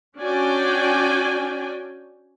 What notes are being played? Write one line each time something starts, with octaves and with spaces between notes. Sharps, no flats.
C#4 D4 F#4 D5 G5 G#5